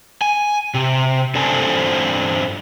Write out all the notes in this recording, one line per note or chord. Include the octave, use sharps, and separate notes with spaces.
G#5
C3
G2 C4 D4 A4 C5 G#5